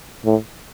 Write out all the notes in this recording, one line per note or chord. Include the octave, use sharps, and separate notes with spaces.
A2